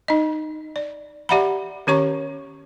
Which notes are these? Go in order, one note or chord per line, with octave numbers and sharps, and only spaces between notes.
D#4 D#5
D5
G4 D5 E5 F#5 A#5 B5
D#3 C#4 G4 C#5 A#5 C#6